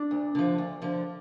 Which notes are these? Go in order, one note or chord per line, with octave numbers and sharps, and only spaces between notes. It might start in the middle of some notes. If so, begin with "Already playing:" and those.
Already playing: D4
D2
D3 F3
D2
D3 F3